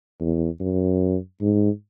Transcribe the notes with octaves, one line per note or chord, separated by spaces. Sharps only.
E2
F#2
G#2